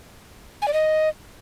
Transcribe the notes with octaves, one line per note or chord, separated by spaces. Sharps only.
G#5
D5
D#5